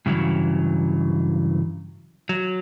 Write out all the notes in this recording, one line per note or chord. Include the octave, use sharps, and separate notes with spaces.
G2 C#3 E3 F#3
F#3